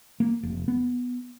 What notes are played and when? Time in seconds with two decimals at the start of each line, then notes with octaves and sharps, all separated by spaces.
0.20 A#3
0.43 F1
0.68 B3